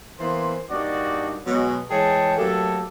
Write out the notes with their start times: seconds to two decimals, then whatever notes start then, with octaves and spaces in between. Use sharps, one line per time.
0.19 E3 A#3 B3 C5 C6
0.70 G2 A#3 D4 D#4 F#4 D5
1.45 B2 F#3 G#3
1.90 E3 G#3 G#4 C#5 G5 A5
2.37 F#3 A3 A#3 G4 A4